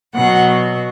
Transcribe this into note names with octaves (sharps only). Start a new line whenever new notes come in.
B2 F#3 F#5